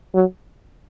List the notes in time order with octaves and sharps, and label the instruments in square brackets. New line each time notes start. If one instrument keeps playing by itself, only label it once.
[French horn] F#3